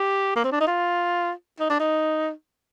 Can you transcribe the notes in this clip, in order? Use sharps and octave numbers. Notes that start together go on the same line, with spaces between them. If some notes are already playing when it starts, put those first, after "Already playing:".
Already playing: G4
A#3
C4
D4
D#4
F4
D#4
D4
D#4